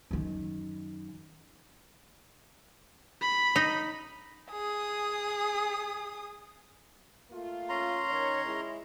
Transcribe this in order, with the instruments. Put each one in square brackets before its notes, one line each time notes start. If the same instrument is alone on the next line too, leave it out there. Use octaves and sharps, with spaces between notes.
[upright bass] F#2 D#3
[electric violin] B5
[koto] D#4
[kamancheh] G#4 D#6
[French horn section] A3 A#3 F4
[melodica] C#4 A#5 C6
[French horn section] D#3 C#5
G#3 E4